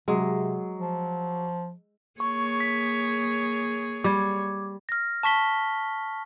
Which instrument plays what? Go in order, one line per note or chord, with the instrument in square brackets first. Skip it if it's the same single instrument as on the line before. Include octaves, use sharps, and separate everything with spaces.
[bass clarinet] C3 [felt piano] F#3 [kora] G#3
[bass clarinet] F3
[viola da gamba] A#3 G#4 C#5 [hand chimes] C#6
[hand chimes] B6
[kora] G3 [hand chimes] D6 G#6
[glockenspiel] F6 A#6
A5 C#6 B6 G7